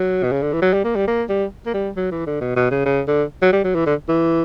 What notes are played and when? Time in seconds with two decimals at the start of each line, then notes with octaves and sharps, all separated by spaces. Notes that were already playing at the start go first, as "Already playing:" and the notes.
Already playing: F#3
0.23 B2
0.32 C#3
0.42 D3
0.53 E3
0.62 F#3
0.73 G3
0.84 A#3
0.96 G3
1.07 A#3
1.29 G3
1.66 A#3
1.74 G3
1.97 F#3
2.12 E3
2.27 D3
2.41 B2
2.56 B2
2.71 C#3
2.86 C#3
3.08 D3
3.42 F#3
3.52 G3
3.64 F#3
3.75 E3
3.86 D3
4.08 E3